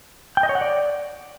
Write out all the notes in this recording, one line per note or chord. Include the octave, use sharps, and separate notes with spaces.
G5
D#5
C#5
F#5
D5